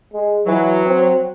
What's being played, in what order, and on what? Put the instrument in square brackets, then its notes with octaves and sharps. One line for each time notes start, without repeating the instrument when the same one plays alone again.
[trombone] G#3
[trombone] E3 [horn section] F#3
[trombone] C4